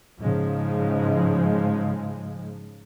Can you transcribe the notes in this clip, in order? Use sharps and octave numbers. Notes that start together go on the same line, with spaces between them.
G#2 C#3 F3 G#3